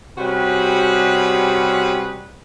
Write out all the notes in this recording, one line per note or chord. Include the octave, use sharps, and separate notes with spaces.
C3 G3 C#4 F#4 G#4 B4